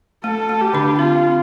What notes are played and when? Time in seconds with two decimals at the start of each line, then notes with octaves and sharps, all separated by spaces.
0.24 A3 A4
0.49 A3
0.61 G4
0.74 D3 D4
0.99 C4 F4